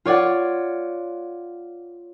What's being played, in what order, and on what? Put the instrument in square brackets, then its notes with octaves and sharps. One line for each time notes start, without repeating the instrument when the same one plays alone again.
[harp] F4 C#5 D5 F#5